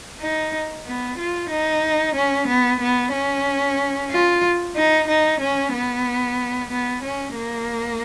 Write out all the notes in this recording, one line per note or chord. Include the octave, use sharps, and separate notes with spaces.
D#4
B3
F4
D#4
C#4
B3
B3
C#4
F4
D#4
D#4
C#4
B3
B3
C#4
A#3